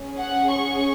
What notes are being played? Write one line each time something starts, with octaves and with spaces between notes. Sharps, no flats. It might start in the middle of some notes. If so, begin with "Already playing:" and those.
Already playing: C#4 G#4
F#5
C#6